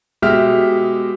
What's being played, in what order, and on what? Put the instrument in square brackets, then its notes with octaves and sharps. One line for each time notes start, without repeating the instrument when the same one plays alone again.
[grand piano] B2 G#3 G4 E5 F6